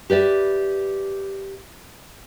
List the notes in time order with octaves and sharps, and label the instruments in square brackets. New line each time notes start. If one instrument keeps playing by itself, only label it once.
[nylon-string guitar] G4 B4 D5 E5